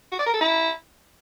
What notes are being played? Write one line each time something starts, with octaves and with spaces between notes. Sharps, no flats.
F#4
D5
A#4
A4
E4